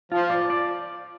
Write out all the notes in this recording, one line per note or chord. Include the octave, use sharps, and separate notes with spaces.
F3 F4
D5
D5